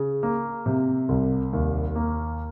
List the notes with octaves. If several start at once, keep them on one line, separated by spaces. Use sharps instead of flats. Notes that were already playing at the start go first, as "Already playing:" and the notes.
Already playing: C#3
A#3
C3
C2
D#2
A#3